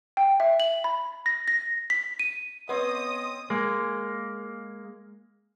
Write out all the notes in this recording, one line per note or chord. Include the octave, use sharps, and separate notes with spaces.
G5
E5
F#7
B5
A#6
A#6
B6
D#7
B3 C4 C#5 D#5 C6 D#6
G#3 A#3